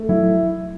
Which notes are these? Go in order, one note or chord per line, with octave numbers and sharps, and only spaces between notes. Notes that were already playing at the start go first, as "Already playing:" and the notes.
Already playing: A3
F#3 E4